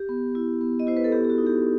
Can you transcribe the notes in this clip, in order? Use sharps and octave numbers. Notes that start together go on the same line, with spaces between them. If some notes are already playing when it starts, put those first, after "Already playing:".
Already playing: G4
B3
E4
B3
D#5
E4 C5
B4
A4
B3 G4
G4
F#4
D#4
G4